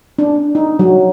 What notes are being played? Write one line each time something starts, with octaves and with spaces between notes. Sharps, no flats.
D4
D#4
F#3